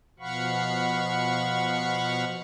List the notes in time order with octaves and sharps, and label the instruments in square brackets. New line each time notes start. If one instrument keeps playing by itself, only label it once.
[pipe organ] B2 F3 F5 F#5 B5 C#6